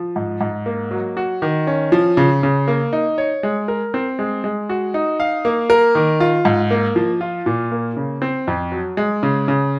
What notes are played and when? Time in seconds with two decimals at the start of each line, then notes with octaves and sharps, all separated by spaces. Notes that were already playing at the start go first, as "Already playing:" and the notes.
Already playing: F3
0.16 G#2
0.41 G#2
0.66 A#3
0.91 F#3
1.17 F#4
1.42 D#3
1.67 C#4
1.92 F3
2.17 C#3
2.43 C#3
2.68 A#3
2.93 D#4
3.18 C#5
3.43 G#3
3.68 A#4
3.94 C4
4.19 G#3
4.44 G#3
4.69 F#4
4.94 D#4
5.20 F5
5.45 A#3
5.70 A#4
5.95 D#3
6.20 F4
6.45 G#2
6.71 A#3
6.96 F3
7.21 F4
7.46 A#2
7.72 A#3
7.97 C#3
8.22 C4
8.47 F2
8.72 F#3
8.97 G#3
9.23 C#3
9.48 C#3